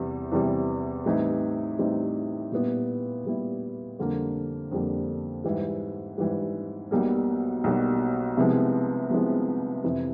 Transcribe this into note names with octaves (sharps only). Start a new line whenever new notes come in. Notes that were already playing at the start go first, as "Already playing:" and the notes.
Already playing: E2 C3 E3 G3
E2 C3 E3 G3
A2 E3 G3 C4 D#4
A2 E3 G3 C4 D#4
A#2 G3 B3 E4
A#2 G3 B3 E4
F2 D3 G3 A#3
F2 D3 G3 A#3
G#2 E3 G3
G#2 E3 G3
B1 B2 G3 A#3
B1 B2 G3 A#3
C2 C3 F3 G#3 B3
C2 C3 F3 G#3 B3
F2 C3 E3